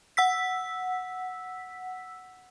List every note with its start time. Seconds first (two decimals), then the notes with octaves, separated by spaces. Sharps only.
0.17 F#5 E6 B6